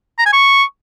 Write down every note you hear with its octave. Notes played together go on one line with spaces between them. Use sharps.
A#5
G#5
C#6